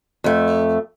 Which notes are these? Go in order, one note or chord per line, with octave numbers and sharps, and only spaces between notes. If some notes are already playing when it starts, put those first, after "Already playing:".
F2 A3